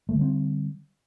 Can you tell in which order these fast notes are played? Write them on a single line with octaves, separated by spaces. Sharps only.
A3 D3 G3 C4